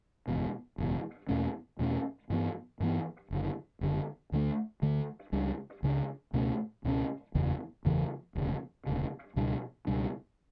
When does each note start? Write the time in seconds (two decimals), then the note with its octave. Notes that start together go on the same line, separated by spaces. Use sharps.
0.28 F#1 E2 B2
0.78 F#1 E2 B2
1.29 E2 B2 A3 C#4
1.79 E2 B2 A3 C#4
2.30 G2 E3 B3
2.80 G2 E3 B3
3.31 F#1 F#2 D3
3.81 F#1 F#2 D3
4.32 D2 D3 A3
4.82 D2 D3 A3
5.32 C#2 C#3 G3 D4
5.83 C#2 C#3 G3 D4
6.33 C#2 B2 A3 C#4
6.84 C#2 B2 A3 C#4
7.35 F#1 E2 C#3 E3
7.85 F#1 E2 C#3 E3
8.35 E1 D2 C#3
8.86 E1 D2 C#3
9.36 C#2 B2 G3 D4
9.87 C#2 B2 G3 D4